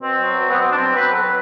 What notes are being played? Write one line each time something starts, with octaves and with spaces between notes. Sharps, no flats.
B2 C4
F#3
B2
B3
B2 C4
D4
F#3 C4
B2 B4
A4
F#3 B4